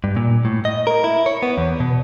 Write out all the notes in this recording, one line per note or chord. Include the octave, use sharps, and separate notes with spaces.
G2
A#2
A2
D#5
A#4
E4
C#5
B3
E2
B2